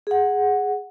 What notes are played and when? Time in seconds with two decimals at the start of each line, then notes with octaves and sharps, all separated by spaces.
0.07 G#4 F#5